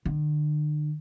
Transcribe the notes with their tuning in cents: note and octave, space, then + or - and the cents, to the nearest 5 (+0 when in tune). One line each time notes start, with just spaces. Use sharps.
D3 +40